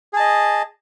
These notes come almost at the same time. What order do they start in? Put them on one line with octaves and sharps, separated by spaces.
G#4 A5 D#5